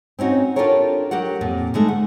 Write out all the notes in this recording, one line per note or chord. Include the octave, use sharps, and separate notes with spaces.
C4 C#4 D#4 F#4
D4 F4 G4 A4 A#4 C#5
F#3 G4 A#4 F#5
F2 A#2
D3 G#3 A3 D#4
F#5